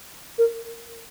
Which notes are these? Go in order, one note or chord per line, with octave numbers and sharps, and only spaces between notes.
A#4